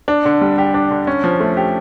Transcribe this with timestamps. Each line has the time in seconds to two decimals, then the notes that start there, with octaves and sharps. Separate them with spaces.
0.08 D4
0.25 D3
0.41 G3
0.58 G4
0.74 D4
0.91 D3
1.07 C#4
1.24 F3
1.40 A3
1.57 G4